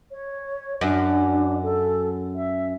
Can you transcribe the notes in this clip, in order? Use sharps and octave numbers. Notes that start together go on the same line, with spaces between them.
C#5
F#2 D4
A4
E5